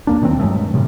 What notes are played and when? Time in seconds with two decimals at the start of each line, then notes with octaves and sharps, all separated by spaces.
0.07 D#2 A#3 D4
0.22 A#2 D#3 F#3 C4
0.39 G2 F#3 G#3 A3
0.74 A2 C3 D#3 G3